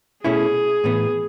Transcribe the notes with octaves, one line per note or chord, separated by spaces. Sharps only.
B2 A3 C#4 E4 G#4
A2 E3 B3